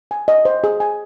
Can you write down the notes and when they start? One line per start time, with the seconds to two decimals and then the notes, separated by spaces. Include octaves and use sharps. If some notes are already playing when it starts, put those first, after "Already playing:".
0.11 G#5
0.28 D#5
0.45 C5
0.64 G#4
0.80 G#5